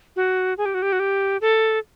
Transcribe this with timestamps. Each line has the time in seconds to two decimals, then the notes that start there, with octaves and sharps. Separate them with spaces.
0.16 F#4
0.58 G#4
0.65 G4
0.74 F#4
0.82 G4
0.92 F#4
0.99 G4
1.41 A4